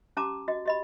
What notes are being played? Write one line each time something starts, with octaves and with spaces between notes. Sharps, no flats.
C#4 G4 A5 A#5 D6
F#4 D#5
G4 D#5 B5